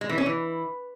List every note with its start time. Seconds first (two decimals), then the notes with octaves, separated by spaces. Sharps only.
0.01 G#3
0.09 E3
0.18 C#4
0.26 E3